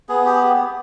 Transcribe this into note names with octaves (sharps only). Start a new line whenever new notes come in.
B3 G#4
G4